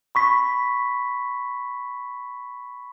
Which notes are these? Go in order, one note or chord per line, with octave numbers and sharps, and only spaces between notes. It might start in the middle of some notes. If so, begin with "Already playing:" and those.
B5 C#6 B6